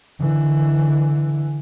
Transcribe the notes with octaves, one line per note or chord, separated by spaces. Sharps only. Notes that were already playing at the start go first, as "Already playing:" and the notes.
D3 E3